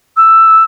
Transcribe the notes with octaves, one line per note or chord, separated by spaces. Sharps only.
E6